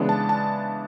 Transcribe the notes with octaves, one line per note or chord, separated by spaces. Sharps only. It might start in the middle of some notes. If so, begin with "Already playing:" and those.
Already playing: C#3 E3 G#3 B3 D4
A5
A5